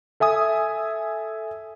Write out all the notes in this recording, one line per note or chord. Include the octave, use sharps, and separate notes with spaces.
A4 E5 G#5 D#6